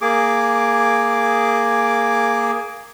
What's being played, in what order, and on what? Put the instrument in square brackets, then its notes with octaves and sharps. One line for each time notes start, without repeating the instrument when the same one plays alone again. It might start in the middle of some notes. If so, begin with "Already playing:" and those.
[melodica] A#3 G#4 D6